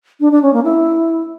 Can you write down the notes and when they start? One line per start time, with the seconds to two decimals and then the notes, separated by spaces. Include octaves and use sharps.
0.21 D4
0.32 D4
0.42 C#4
0.53 A#3
0.64 E4